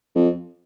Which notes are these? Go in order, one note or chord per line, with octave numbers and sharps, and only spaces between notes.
F2